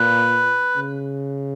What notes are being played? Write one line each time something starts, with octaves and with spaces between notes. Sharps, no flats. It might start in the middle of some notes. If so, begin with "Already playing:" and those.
Already playing: A#2 B4
C#3